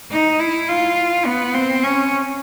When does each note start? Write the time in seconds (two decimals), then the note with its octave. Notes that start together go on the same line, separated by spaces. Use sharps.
0.11 D#4
0.39 E4
0.68 F4
1.26 B3
1.55 C4
1.84 C#4